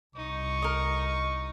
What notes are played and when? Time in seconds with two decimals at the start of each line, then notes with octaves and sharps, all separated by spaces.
0.16 C2 D#4 C#6
0.62 A#4 D#5